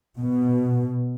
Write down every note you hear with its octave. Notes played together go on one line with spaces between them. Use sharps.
B2